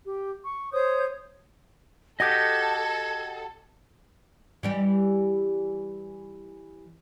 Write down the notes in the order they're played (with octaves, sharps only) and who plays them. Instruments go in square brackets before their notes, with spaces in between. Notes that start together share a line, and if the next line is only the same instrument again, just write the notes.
[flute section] G4
C#6
C5 C#5 D#6 G6
[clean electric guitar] F#4 G4 [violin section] A4 [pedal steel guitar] D#5 F#5 D#6 [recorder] G#6
[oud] E3 G3 G4